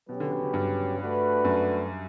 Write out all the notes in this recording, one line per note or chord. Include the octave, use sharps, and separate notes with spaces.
B2 F#3 C#4 G4 B4
D3
D3
C#3
G2
A3 D4 F#4 B4
F#2